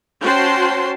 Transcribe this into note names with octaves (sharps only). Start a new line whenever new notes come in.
C#4 F#4 C5 G5 A5 C6